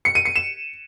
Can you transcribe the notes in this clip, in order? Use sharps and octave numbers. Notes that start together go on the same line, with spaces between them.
C#7
D#7
C#7
E7